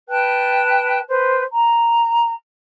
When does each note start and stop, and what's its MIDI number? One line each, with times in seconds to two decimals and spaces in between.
0.08 0.99 71
0.08 0.99 79
0.08 0.99 81
0.08 0.99 90
1.09 1.43 71
1.09 1.43 72
1.53 2.33 82